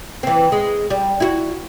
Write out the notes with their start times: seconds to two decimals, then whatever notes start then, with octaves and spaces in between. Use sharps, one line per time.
0.23 E3 C4
0.52 G#3
0.90 G3
1.20 E4 F#4